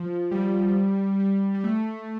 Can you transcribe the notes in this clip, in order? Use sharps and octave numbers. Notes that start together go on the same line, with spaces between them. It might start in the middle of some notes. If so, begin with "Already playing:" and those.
Already playing: F3
G3
G3
G3
A3